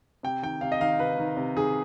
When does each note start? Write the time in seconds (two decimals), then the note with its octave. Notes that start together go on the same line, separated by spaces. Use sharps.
0.23 C3 G5
0.43 D#3 G5
0.61 C3 F5
0.72 D#5
0.80 D#3 F5
0.99 C3 B4
1.18 D#3
1.37 C3
1.56 D#3 G#4